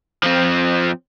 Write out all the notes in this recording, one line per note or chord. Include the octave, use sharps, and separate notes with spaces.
F3 C4